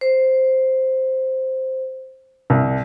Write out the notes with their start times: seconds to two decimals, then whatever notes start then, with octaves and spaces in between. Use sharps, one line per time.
0.01 C5
2.50 C2